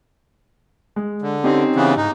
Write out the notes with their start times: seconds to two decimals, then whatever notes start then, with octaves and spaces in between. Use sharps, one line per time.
0.96 G#3
1.22 D3
1.44 C4 C#4 D#4 G4
1.76 C#3 E3 B3
1.97 G#2 D#4